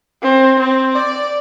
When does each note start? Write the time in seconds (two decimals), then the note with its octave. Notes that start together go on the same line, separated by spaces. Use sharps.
0.23 C4
0.59 C4
0.96 D5